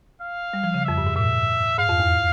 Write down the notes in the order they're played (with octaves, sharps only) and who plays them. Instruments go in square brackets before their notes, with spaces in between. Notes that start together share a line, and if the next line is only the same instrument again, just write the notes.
[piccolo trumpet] F5
[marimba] G3
F3
C#3
[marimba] F2 [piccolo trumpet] E5
[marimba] G2
G#2
[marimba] A#2 [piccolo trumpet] E5
[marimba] G#2 [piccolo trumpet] F5
[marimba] F2
E2